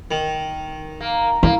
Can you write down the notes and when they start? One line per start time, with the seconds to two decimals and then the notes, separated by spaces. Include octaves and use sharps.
0.11 D#3
1.01 A#3
1.43 A#3 E4